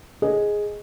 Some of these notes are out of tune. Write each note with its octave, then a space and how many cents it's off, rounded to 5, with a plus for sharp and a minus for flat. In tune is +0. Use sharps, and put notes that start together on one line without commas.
G#4 +0 D#5 +0